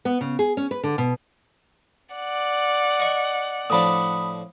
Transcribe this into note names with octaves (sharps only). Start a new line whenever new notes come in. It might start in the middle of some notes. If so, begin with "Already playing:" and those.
B3
C#3
G#4
C#4
B4
D3
B2
D5 F#5
D#5 C#6
A2 F3 D4 B5 D#6